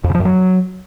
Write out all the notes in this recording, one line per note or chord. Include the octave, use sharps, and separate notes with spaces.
F2
C#3
F3
F#2
F#3